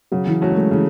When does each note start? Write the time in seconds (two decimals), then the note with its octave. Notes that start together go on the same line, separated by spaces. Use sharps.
0.12 C#3 F#3
0.26 E3
0.41 F#3 A3 C#4 F#4
0.51 G#3
0.55 A3
0.71 C#3 E3